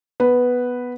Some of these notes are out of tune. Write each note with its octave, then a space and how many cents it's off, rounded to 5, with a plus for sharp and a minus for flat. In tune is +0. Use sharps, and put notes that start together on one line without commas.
B3 +0 B4 +0